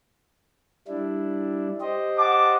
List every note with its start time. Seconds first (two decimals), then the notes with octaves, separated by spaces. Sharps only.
0.88 G3 D4 E4
1.81 G4 C5 D#5
2.18 F#5 A5 D6